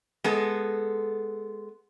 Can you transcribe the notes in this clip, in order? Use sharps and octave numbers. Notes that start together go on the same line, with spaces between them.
G#3 B3 A4